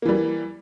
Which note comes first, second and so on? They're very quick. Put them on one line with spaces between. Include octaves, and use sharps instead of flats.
A#3 E3 G3